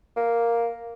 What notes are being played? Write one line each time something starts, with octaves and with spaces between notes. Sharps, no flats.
A#3